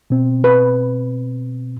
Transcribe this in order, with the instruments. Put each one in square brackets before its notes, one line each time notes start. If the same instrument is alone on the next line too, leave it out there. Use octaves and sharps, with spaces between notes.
[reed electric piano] B2 C4
[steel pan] B4